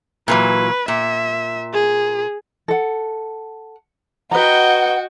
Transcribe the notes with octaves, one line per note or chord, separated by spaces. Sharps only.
A#2 E3 F#3 B4
A#2 E5
G#4
A4 F#5
F#4 B4 D#5 F#5 G5 A#5